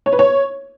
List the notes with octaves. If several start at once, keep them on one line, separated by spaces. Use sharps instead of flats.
C#5
B4
C#5